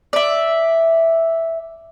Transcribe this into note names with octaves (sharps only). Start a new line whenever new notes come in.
D5 E5